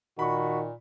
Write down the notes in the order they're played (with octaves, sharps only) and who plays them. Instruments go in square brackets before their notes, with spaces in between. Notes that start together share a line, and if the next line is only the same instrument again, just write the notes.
[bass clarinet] A#2 [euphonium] D#3 [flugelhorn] F#4 [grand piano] B5 C#6